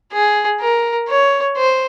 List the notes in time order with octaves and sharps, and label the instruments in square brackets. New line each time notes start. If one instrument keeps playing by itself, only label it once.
[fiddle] G#4
A#4
C#5
C5